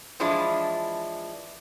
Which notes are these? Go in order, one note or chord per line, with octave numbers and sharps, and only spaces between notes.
E3 F3 G#3 D4 E4